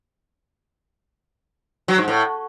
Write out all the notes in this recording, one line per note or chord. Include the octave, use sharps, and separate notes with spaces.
F#3
G#2
A2